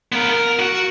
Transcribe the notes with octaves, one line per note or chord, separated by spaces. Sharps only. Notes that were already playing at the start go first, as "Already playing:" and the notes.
B3 A#4
A#4
F#4